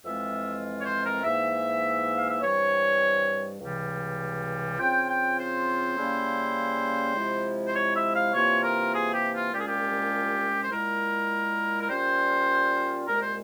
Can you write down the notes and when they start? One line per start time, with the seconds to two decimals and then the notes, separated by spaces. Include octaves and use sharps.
0.04 F2 E3 G#3 C4 F4 E5
0.79 C#5
0.83 C5
1.03 A#4
1.23 G#2 E3 A#3 E5
2.17 F5
2.29 E5
2.41 G2 E3 G3 C4 C#5
3.60 C#2 C3 E3 G3
4.78 C#3 F3 C4 F4 G5
5.07 G5
5.37 C5
5.97 C#3 G3 A#3 C#4 E4
7.15 C3 F3 G#3 E4
7.67 C5
7.74 C#5
7.94 E5
8.14 F5
8.34 C3 E3 A#3 F4 C#5
8.63 A#4
8.93 G#4
9.12 G4
9.32 F4
9.52 C2 A#2 G#3 C#4 F4 G4
9.60 G#4
9.67 G4
10.60 C5
10.71 A#2 G#3 E4 A#4
11.79 A#4
11.89 A#2 G3 C#4 F4 C5
13.07 C2 A#2 G#3 A#4
13.21 C5